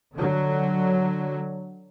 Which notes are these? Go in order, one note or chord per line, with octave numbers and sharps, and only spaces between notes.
D3 F#3